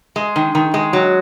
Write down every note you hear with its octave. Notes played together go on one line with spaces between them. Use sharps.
G#3
D#3
D#3
G#3
F#3